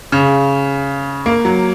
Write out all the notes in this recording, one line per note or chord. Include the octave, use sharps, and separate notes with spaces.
C#3
A#3
F#3